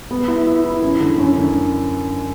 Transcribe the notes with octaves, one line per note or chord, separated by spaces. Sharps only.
B3
E4
E4
E4
F#2
D3
F#2
D3